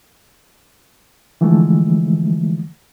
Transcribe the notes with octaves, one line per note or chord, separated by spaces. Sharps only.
D3 E3 F3 G#3 A3